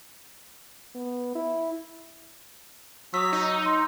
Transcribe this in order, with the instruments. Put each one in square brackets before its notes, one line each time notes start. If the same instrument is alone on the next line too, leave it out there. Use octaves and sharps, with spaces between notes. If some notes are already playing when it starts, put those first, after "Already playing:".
[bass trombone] B3
E4
[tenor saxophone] F#3 [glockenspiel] D#6 E6 [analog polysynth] B6
[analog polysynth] D#4
[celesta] C6